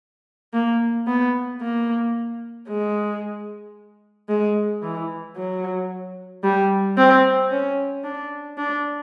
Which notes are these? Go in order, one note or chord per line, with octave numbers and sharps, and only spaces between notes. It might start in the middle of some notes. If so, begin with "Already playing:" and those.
A#3
B3
A#3
G#3
G#3
E3
F#3
G3
C4
C#4
D4
D4